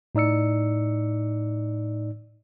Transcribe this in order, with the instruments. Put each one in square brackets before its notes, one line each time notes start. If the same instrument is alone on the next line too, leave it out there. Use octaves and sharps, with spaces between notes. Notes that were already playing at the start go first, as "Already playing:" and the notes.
[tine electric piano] A2 D#4 D5 E6 C#7